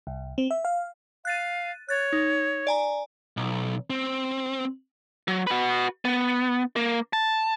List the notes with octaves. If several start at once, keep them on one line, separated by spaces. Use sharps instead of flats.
C2
C4
E5
F5
F5 F#6 A6 D#7
C#5 F#6 A6
D#4
D5 G#5 A#5
B1
C4
F#3
F#4 B4
B3
A#3
A5